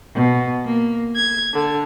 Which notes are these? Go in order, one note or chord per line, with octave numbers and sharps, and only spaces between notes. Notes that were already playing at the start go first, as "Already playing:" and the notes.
B2
A#3
G#6
D3